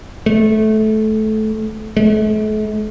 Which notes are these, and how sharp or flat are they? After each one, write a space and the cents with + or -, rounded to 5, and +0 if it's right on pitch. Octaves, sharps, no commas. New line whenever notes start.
A3 -20
A3 -45